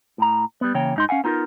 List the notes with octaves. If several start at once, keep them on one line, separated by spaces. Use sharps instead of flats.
A2 A#5
G3 B3
C#3 E3 A#3 C#5 G5
G#2 D#4 C6
C#4 F5 F#5 G#5
B3 D#4 F4 G4 A#4